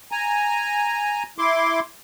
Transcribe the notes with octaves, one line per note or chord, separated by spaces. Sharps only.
G#5 A#5
E4 C6 D6